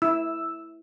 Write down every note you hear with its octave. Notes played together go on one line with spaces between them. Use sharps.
E4 E6